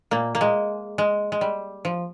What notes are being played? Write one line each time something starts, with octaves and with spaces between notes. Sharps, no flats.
A#2 A#3
A#3
G#3
G#3
G#3
G3
F3